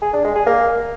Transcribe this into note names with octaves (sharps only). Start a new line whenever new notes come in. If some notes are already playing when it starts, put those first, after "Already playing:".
G#4
D4
G#3
G#4
A#3